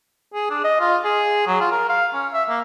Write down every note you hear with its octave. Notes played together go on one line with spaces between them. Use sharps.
G#4
D4
D#5
F4
G#4
F#3
F4
A#4
F5
C#4
E5
A#3